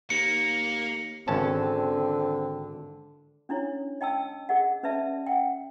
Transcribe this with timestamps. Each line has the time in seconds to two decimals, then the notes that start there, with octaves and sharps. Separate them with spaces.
0.10 D#2 A#3 C#7
1.28 G#1 D3 C4 C#4 A5
3.49 C#4 D4 E4 C#5
4.01 D#5 G5 A5 E6
4.49 G#4 A#4 D#5 F#5
4.83 C#4 B4 D5 E5 A5
5.27 F#5 G5